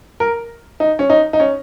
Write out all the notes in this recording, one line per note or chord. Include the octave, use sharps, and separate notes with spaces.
A#4
D#4
C#4
D#4
D#4
C#4